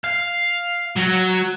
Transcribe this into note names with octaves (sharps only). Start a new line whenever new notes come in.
F5
F#3 F#4